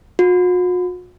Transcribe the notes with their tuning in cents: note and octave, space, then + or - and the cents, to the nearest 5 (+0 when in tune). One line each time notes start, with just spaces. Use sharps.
F#4 -45